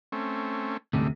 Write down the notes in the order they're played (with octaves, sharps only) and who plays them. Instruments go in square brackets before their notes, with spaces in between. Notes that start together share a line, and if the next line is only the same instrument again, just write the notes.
[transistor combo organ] A3 C4 C#4
[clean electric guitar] D2 C3 [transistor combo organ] G#2 G3 A3